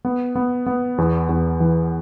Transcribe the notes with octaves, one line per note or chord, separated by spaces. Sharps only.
B3
B3
B3
E2
E2
E3